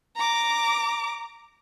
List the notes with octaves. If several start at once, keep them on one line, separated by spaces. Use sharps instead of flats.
A#5 D6